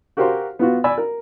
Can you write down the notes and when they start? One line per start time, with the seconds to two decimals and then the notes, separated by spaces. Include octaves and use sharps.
0.17 F#4 G4 A#4 C5 F5 C6
0.59 B3 F4 F#4
0.84 D5 G#5 B5 E6
0.98 A#4